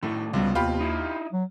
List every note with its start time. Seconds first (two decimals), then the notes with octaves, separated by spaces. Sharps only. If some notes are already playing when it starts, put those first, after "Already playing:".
0.03 A2 D#3 A3
0.33 C#2 C3 G3 B3
0.55 D#2 F4 G4 B5
0.80 D#4 E4
1.33 F#3